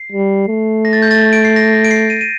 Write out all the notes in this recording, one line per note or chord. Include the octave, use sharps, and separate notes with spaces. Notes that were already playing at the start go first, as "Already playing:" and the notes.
Already playing: C7
G3
A3
A#6
A6
G6
A6
D7
C7
A#6
A#6
D7
C7
D#7
D#7